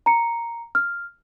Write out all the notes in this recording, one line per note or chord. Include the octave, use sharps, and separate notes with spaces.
A#5 C#7
F6